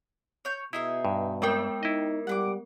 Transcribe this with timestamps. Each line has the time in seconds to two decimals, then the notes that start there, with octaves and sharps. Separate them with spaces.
0.45 C#5 G6
0.73 B2 D#4 E4 G#4 E5
1.05 G2
1.42 G#3 B3 C4 A#4 G5 E6
1.83 D#4 E4 D#5
2.27 G3 F#5 B5 D6